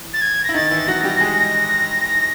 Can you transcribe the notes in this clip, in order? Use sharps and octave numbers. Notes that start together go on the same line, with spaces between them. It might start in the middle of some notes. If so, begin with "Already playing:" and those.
Already playing: E3
A6
G#6
E4 A#6
D#3 D#4 A6
E3 E4
F#3 F#4 A#6
G3 G4
G#3 G#4